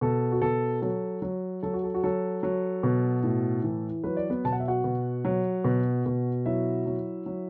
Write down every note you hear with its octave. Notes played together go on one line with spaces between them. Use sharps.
B2 A4
F#4
B2 A4
F#3 A4
F#3
F#3 A4
F#4
A4
F#4
F#3 A4
F#3
B2
A2
E3
F#3 B4
D5
B3 B4
B2 A5
F#5
E5
F#4 F#5
B2
F#3
B2
B2
F#3 E4 E5
F#3
F#3